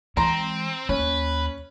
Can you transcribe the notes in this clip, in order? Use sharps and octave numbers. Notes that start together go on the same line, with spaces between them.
E3 G#3 C4 A#5 C6
D#2 C#4 B4